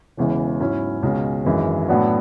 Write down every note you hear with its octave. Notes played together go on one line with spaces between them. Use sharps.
E1 E2 C#3 E3 G#3
G#2 F#3 C#4 E4
C#2 B2 G#3 C#4
G#1 F#2 E3 G#3
A2 F#3 B3 D4 F#4